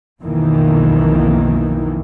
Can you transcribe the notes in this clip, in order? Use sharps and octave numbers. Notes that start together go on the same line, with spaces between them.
B1 F2 B2 D#3 E3 A#3